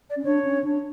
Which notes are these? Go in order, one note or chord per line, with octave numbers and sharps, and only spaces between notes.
D5
C#4
D4 C#5
C#4
D4